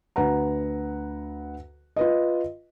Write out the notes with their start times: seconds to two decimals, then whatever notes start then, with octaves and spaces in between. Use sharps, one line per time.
0.16 D2 B4 F#5 A#5
1.96 F4 B4 D#5